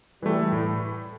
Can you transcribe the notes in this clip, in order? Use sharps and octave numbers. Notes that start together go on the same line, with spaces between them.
E3 G3 A3
A2